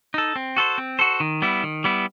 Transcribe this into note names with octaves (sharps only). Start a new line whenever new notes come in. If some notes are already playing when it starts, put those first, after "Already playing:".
D#4 A4
C4
F#4 A4 C5
C4
F#4 A4 C5
D#3
G3 B3 E4
D#3
G3 B3 E4